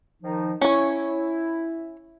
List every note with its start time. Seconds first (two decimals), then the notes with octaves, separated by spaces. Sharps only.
0.22 D#3 F3 D#4
0.61 C#4 E4 C#5